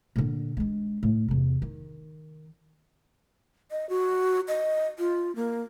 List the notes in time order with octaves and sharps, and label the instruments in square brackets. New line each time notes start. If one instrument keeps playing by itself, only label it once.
[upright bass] A#2 D3
G#3 D4
A2
E2 C3
D#3
[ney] D#5
F#4
D#5
F4
A#3